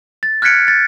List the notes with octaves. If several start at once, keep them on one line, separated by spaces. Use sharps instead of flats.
A6
F6 F#6 G#6 B6 C#7 D7
A6